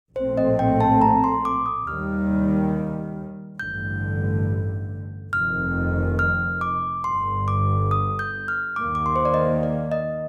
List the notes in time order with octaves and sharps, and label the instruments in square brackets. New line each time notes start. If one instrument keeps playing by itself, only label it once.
[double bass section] A#1 A2 A3 C4 [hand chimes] C5
[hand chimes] D#5
G5
A5
A#5
C6
D6
D#6
[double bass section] D#2 D#3 G3 [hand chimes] F6
[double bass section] A1 G2 D3 [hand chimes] G6
[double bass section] F1 F2 D#3 [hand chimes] F6
[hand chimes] F6
D6
[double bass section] G1 G2 D3 [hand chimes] C6
[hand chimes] D6
D#6
G6
F6
[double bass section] D#2 D#3 A#3 [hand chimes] D6
[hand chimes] D6
C6
C5
D5
D#5
D5
D#5